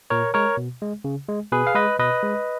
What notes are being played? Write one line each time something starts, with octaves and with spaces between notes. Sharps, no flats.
A#2 A#4 C#5
G#3 A#4 C#5
B2
G#3
C#3
G#3
B2 G#4 B4
F5
G#3 B4 D#5
B2 B4 D#5
G#3